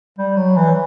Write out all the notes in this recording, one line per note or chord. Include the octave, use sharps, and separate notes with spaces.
G3
F#3
E3